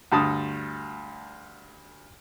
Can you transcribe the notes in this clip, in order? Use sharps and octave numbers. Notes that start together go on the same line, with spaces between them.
D2 G2 A5 D#6